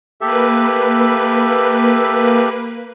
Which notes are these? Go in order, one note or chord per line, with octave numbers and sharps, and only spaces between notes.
A#3 G4 A4 B4 E5